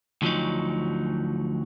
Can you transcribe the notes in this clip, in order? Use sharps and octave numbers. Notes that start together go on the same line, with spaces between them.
D2 F3 F#3 D#4